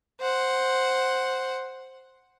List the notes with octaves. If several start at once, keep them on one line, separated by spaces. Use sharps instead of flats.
C5 F#5